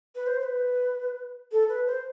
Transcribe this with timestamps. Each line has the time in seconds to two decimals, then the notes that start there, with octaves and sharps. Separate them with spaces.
0.15 B4
0.27 C5
0.40 C5
0.43 B4
1.52 A4
1.69 B4
1.87 C5